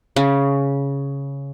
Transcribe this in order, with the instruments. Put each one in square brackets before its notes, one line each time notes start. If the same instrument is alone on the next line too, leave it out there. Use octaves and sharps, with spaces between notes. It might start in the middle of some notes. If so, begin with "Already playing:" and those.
[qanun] C#3